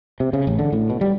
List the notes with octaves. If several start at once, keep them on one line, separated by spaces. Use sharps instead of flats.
C3
C#3
A1
D3
A2
B2
G3